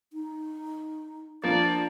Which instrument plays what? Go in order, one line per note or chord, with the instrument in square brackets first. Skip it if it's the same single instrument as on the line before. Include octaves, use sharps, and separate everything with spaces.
[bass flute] D#4
[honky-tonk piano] F3 A#3 [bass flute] D4 [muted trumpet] D5